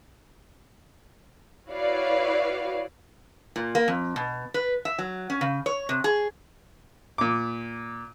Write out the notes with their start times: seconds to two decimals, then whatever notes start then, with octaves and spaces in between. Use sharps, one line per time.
1.68 E4 F#4 B4 C#5 D5 F5
3.56 A#2
3.75 A#3
3.88 F2
4.16 B2
4.54 B4
4.85 E5
4.98 F#3
5.30 C#4
5.41 C#3
5.66 C#5
5.89 C3
6.04 G#4
7.18 A#2 D6